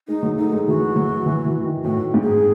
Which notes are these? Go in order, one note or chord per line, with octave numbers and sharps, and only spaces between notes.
G#3 D#4
F#3
A3 D#4
G#3
E3 F#4
F#3
E3
E3
D#3
A2 F#4
G#2
G#4